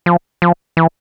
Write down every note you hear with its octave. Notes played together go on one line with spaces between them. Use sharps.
F3
F3
E3